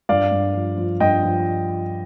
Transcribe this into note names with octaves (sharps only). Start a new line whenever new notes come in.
G2 D5 F5
G2
F3
F3
G2 D#5 G5
F3